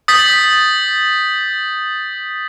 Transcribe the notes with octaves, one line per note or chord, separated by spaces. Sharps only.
D#6 G6 A6 B6